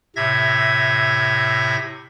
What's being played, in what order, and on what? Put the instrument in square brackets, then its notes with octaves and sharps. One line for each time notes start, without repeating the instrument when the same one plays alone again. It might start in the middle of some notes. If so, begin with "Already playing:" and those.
[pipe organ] A2 C3 E5 G#6 A#6